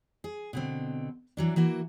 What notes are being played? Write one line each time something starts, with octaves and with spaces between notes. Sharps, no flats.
G#4
B2 D3 C4
E3 F#3 D4
E3 A#3 F#4